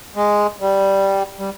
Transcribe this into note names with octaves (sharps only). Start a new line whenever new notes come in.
G#3
G3
G3